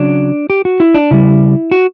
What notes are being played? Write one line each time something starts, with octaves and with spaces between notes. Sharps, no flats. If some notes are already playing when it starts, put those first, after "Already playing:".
Already playing: C#3 F#3 D4
G4
F#4
E4
D4
C#3 G3 E4
F#4